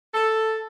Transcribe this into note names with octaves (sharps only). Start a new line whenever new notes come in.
A4